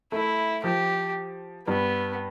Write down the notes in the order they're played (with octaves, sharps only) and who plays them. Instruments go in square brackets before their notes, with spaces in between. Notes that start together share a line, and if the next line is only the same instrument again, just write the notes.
[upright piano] A3 [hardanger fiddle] E4
[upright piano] F3 [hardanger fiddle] G4
[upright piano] G2 [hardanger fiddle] B3